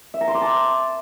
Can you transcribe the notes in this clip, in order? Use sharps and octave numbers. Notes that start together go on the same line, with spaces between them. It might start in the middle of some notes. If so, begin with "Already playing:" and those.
E5
A#5
C6
D6
A5